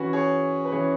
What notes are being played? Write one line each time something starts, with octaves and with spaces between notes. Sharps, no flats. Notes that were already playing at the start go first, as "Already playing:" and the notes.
Already playing: E3 C#4 F#4 B4
G#4 C#5
B4
E3 C#4 G#4 C#5